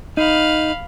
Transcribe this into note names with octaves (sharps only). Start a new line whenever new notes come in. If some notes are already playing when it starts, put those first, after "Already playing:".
D#4 F5 B5